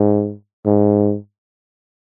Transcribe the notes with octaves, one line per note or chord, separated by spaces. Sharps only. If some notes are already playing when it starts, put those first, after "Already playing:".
Already playing: G#2
G#2